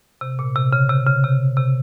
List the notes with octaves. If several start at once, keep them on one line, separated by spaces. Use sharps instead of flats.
C3
A#2
C3
C#3
C3
C#3
C3
C3